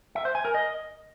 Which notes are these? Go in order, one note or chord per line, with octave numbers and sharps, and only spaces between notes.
E5
C5
G#5
A#4
D#5